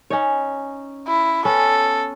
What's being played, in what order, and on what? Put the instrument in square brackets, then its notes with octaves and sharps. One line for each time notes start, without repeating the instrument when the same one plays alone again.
[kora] C#4 D#4 C#5
[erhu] E4
[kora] B3 C#4 B4 [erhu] A4